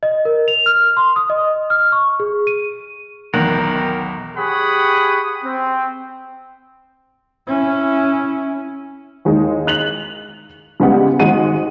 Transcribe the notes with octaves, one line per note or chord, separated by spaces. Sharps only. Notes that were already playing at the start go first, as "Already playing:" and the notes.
D#5
A#4
F7
F6
C6
D#6
D#5
F6
C#6
G#4
D#7
B1 E2 D#3 A#4 F#5
G4 G#4 C#5 F#5 B5 D#6
C4
C#4 E4
D#2 G#3 D#4
F#6 F7 F#7
C#3 G3 G#3 B3 G4 F#5
G#1 G#3 F#5 D#7